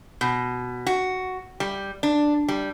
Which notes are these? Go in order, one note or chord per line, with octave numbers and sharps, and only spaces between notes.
B2
F#4
G3
D4
G3